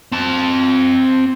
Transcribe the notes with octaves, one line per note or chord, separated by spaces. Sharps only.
C4 A5